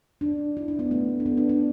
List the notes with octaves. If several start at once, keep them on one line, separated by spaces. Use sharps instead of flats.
D4
E4
D4
B3
A3
D4
B3
D4
D4